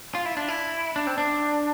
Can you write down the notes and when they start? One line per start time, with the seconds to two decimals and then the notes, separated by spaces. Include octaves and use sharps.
0.15 F4
0.25 E4
0.37 D4
0.48 E4
0.96 D4
1.07 C4
1.18 D4